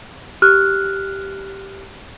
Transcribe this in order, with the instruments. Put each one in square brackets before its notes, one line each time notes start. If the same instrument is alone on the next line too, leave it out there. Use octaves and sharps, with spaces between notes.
[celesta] G4 F6 F#6